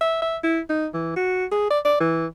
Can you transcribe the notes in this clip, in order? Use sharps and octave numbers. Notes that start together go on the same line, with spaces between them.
E5
E5
E4
D#4
E3
F#4
G#4
D5
D5
E3